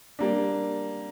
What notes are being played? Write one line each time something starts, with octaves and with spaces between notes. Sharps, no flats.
G3 A#3 D4